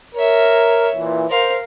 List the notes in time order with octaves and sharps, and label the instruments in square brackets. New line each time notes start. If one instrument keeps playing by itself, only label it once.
[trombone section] A#4 [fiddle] C#5 E5
[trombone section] A#2 E3
[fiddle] A#4 F5 [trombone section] C5